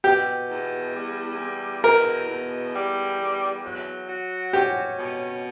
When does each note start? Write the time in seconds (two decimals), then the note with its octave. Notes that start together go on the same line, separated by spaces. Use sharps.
0.04 B2 G4
0.49 E2
0.93 G3
1.39 E2
1.84 B2 A#4
2.28 E2
2.74 G3
3.18 E2
3.64 F#3
4.08 F#4
4.53 C#4 G4
4.98 B2